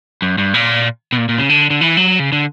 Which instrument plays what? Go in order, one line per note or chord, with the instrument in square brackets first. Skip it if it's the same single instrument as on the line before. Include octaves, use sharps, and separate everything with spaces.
[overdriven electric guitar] F#2
G2
A#2
B2
A#2
A#2
C#3
D3
D3
E3
F#3
C#3
D3